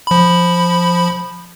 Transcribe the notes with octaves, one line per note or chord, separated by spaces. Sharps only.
F3 B5